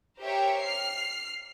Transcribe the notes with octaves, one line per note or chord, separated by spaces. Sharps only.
G4 A#4 C5 C#5 E5 G5
F6 C7